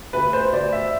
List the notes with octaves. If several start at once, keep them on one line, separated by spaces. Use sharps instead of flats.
D2 B4
C5
D2 D5
E5